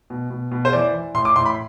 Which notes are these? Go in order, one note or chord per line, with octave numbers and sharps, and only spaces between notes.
B2
B2
B2
C5
E3 D5
E3
A2 C6
D6
A2 C6
B5